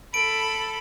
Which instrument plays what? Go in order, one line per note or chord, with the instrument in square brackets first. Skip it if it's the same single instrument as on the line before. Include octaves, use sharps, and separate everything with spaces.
[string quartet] A4 B5 [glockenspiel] D7